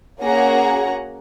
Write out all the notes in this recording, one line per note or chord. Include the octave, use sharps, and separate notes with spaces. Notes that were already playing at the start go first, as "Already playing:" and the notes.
A#3 C#4 F#4 G#4 F#5 A#5